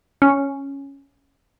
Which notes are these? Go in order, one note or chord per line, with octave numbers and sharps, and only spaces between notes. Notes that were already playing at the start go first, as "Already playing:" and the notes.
C#4